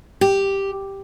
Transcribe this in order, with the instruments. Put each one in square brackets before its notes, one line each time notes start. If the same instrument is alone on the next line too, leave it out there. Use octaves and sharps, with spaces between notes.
[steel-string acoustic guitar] G4